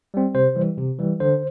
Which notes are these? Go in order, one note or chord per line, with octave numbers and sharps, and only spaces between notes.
G3 C4
C3 C5
E3 G3
C3
E3 G3
D3 C5